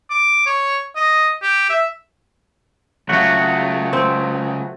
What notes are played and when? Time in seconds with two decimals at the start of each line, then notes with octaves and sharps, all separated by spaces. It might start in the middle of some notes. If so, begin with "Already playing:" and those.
0.10 D6
0.46 C#5
0.96 D#5
1.42 G4
1.70 E5
3.09 C#3 F#3 A3 F4 F#4
3.93 C4